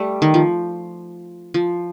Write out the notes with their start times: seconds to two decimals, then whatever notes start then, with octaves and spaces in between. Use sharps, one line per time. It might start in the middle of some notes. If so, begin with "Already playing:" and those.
Already playing: G3 A3
0.22 D#3
0.34 F3
1.54 F3